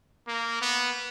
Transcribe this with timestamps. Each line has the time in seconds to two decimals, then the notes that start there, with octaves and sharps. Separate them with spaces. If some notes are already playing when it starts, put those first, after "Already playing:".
0.28 A#3
0.62 B3